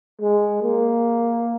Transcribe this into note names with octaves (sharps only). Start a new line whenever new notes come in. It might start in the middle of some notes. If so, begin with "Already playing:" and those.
G#3
A#3